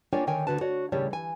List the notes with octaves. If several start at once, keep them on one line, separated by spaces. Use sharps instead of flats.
A#3 D4 F4 C#5 G5 G#5
D3 D#3 A#4 C#5 G5 G#5
D2 A#2 D3 F#4 B4 A5
F#4 C#5 D5
D#2 A2 C#3 G3 C#5 A5
E3 G#5